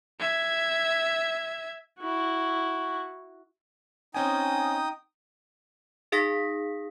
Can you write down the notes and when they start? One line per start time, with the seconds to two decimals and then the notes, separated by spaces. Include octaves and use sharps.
0.19 E5 G#6
1.99 E4 F#4
4.14 C4 C#4 D#4 G5 G#5 D#6
6.12 D#4 G#4 F5 D#6 A#6 B6